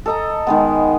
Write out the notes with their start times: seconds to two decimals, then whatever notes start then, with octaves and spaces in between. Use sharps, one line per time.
0.06 A4 D#5 A#5
0.47 D#3 G#3 B3